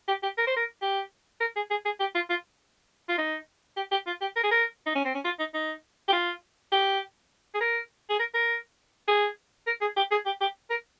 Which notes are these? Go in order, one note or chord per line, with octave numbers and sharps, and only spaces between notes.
G4
G4
A#4
C5
A#4
G4
A#4
G#4
G#4
G#4
G4
F4
F4
F4
D#4
G4
G4
F4
G4
A#4
G#4
A#4
D#4
C#4
C4
C#4
F4
D#4
D#4
G4
F4
G4
G#4
A#4
G#4
A#4
A#4
G#4
A#4
G#4
G4
G#4
G4
G4
A#4